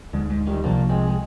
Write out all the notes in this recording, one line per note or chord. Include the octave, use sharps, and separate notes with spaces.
D2 G#2 D3 G#3
G#2
D#3 G3
C2 C3 F3 A#3 D4
G#3 C4
G#3